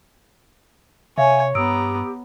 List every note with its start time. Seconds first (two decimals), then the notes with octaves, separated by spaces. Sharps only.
1.18 C3 C#5 E5 F5 G#5
1.55 G2 B3 G4 A#5 D#6 E6 D7